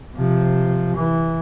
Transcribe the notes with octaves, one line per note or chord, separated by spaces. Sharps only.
C3 F3
E3